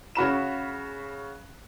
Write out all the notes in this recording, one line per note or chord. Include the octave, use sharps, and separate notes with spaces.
C#3 F#4 B5 E7